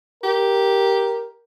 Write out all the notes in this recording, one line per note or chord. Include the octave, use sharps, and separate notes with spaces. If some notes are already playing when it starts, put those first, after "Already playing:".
G4 A#4